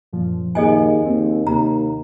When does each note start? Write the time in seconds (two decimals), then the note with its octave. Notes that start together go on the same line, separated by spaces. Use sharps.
0.13 F#2 A#2 F3
0.55 D#2 G#4 D#5 G#5
1.06 D#2 C4
1.47 D#2 C3 A#5